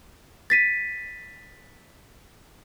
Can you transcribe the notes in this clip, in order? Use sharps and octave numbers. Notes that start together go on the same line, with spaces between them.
A6 B6 D#7